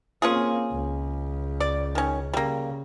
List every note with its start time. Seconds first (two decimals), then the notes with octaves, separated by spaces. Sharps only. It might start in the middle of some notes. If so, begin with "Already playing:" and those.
0.22 A#3 C4 C#4 F4 G#4
0.72 C#2
1.60 D5
1.95 D#3 C#4
2.33 C#3 G3 A#3